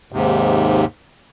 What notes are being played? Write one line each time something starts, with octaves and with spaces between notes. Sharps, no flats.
D#2 G#2 C3